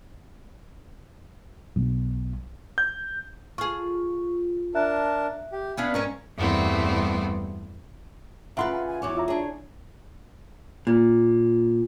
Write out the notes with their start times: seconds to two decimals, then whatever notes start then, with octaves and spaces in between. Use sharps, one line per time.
1.76 B1
2.78 G6
3.58 F4 G#4 C#6
4.75 D4 A#4 E5 A5 F#6
5.52 G4
5.77 B3 C#4 D4 F5 B5
5.94 G#2 C4 C#4 A#4 G#5 C#6
6.36 E2 G2 G3 A3 B3 C4
8.57 C#3 F4 B4 E5 F#5 A#5 C6
8.72 G#5
8.88 G#5
9.02 E2 F#4 C#5 D6
9.15 F4 E5 A#5
9.28 D4 G#4 C#5
10.87 A#2